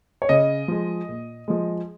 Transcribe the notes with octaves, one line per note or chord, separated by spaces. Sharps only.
C#5
C#3 D#5
F3 G#3
A#2
F3 G#3